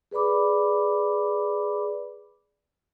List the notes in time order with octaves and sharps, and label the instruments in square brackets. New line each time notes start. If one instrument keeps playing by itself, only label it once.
[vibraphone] G#4 B4 D5 B5 D6